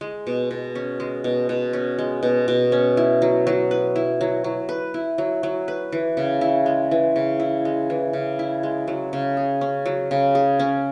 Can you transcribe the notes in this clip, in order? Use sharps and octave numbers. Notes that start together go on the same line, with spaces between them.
G#3
B2
B2
C#4
G#3
B2
B2
C#4
G#3
B2
B2
C#4
E4
F#3
F#3
B4
E4
F#3
F#3
B4
E4
F#3
F#3
B4
E3
C#3
E4
G#3
E3
C#3
E4
G#3
E3
C#3
E4
G#3
F#3
C#3
G#4
C#4
F#3
C#3
G#4
C#4